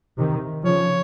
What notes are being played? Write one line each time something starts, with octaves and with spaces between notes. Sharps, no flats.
C3 D#3
C#3 F3 C#5